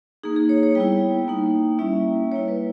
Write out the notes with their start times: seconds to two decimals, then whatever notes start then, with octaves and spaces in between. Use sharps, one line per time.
0.24 A#3 D#4 G#4
0.36 G#4
0.49 C#5
0.63 C#5
0.75 G3 B3 E4 G5
1.28 A#3 D#4
1.79 G3 A#3 C#4 E4 E5
2.31 G3 A#3 E4 C#5
2.48 B4